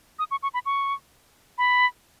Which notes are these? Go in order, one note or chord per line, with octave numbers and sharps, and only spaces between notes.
D#6
C#6
C#6
B5
C#6
B5